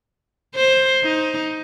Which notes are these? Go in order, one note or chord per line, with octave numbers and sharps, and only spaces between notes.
C5
D#4